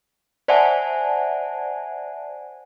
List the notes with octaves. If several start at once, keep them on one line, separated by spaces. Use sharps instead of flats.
C5 D5 E5 F#5 G#5 A5